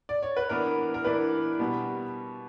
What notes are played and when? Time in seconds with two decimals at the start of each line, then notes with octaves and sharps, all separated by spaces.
0.09 D5
0.23 C#5
0.37 B4
0.49 E3 B3 D4 A#4
0.94 A#4
1.04 E3 B3 D4 B4
1.59 B2 G3 B3